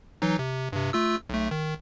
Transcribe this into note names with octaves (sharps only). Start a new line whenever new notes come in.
E3 F#3 D#4
C3
G2 C3
A3 F4 E6
B1 A3
D#3